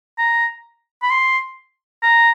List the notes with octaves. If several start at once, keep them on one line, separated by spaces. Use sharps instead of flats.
A#5
B5
C6
A#5